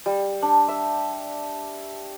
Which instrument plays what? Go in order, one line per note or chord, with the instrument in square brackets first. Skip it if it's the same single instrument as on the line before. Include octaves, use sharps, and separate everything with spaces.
[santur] G3
D4
E5